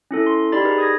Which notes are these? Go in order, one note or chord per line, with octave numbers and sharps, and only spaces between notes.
C#4 E4 A4
C6
D#4 G4 D5 B5 A6
G#4 A#4 B4
D#6 G#6 A#6